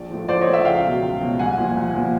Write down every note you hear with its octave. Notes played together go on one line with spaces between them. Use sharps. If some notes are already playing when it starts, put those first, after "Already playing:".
Already playing: A#1 D5
A2 F3
A#1 C5 D5
C#5 D#5
A2 F3
E5 F#5
C#2 F5 G5
B2 F#3
C#2
B2 F#3
C2 F#5 G#5
A#2 F3
C2
A#2 F3